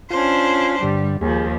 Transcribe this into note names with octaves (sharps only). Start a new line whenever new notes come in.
C#4 D4 F4 C5
G2 D3 G3
D#2 F3 G#4